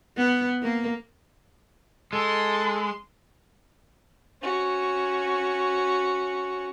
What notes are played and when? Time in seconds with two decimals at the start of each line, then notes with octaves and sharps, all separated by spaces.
0.17 B3
0.63 A#3
2.13 G#3 A4 C6
4.42 C#4 F#4